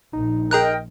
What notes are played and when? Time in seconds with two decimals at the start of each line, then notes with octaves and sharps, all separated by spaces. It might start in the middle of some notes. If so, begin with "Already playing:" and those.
0.13 A#1 D#4
0.51 G#4 A#4 D#5 G5 A#5 F#6